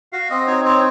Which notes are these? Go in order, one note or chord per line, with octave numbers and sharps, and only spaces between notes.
F#4 F5
C4 D#5
D#4 C#5
C4 C#5